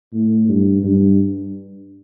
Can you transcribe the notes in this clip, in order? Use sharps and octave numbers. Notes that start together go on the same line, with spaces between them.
A2
G2
G2